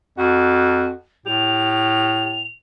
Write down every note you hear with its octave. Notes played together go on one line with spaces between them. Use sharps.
F2 F#4 A5
A2 G4 F7